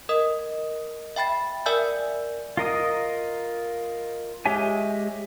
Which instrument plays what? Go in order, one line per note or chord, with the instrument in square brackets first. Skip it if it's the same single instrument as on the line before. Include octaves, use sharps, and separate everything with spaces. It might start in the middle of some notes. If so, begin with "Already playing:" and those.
[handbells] A#4 D#5 D#6
E5 G5 B5 A6
A#4 D5 E5 G#5 E6 G6
[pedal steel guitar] F4 A#4 D#5 D#6
G#3 G4 C#5 E5 G#5